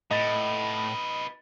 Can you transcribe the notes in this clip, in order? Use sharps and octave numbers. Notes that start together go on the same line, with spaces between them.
A2 D#4 B4 D#5 A6